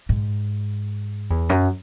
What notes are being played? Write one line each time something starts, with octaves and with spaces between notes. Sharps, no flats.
G#2
E2
F#2